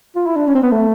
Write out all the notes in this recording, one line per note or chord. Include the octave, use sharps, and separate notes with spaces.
F4
E4
D4
C#4
C4
B3
A3